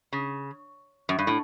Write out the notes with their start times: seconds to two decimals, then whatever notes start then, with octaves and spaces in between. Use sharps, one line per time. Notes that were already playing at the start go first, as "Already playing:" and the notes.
0.13 C#3
1.09 F#2
1.19 G2
1.27 A2